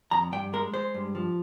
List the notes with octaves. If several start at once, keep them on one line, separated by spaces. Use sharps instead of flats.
F2 A#5
G2 G5
G#3 A#4
G#3 C5
G2
F3